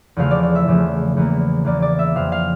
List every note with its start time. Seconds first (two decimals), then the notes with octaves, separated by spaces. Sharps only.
0.16 E2 C#3 F3 A3 F5
0.31 D5
0.43 D5
0.55 E5
0.67 E2 C#3 F3 A3
1.17 E2 E3 A#3
1.64 E2 E3 A#3 D5
1.82 D5
1.99 E5
2.15 F2 C#3 E3 F5
2.32 F5